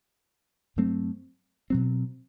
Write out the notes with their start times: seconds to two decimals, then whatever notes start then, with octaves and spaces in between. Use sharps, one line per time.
0.76 G2 F#3 A3 C4
1.70 B2 F#3 C4